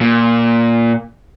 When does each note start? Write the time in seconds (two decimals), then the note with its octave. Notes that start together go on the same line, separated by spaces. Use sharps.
0.01 A#2